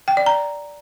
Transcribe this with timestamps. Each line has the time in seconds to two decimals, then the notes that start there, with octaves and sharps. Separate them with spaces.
0.08 G5
0.17 D5
0.26 A#5